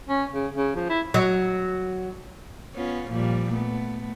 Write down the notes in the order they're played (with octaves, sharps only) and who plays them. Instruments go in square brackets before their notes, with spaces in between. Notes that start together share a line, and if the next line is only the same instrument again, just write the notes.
[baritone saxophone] C#4
C#3
C#3
F3
E4
[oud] F#3
[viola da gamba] B3 C#4 F4
A#2 F3 G3
A3 B3